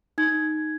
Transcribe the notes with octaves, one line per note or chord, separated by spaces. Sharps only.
D#4 G#6